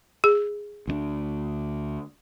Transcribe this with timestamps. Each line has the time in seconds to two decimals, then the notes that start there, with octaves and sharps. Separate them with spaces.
0.24 G#4
0.88 D2 G#3 D4